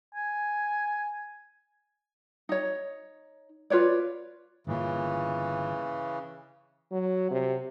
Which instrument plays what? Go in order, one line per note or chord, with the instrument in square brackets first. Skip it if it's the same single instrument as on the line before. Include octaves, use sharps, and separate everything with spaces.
[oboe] G#5
[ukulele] D#4 C#5
F4 B4 C#5 D5
[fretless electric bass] G1 A#2 [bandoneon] C#3 E3
[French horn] F#3
C3